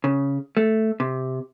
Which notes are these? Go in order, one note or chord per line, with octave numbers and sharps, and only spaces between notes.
C#3
A3
C3